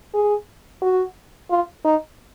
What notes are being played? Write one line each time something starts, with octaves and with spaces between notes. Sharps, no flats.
G#4
F#4
F4
D#4